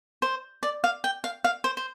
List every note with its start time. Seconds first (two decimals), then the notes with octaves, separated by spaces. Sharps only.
0.22 C5
0.63 D5
0.84 F5
1.04 G5
1.24 F5
1.44 F5
1.64 C5
1.77 C5